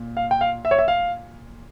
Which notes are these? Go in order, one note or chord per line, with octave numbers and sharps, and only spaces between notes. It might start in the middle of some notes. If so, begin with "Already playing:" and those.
Already playing: A#2
F5
G5
F5
E5
C#5
E5
F5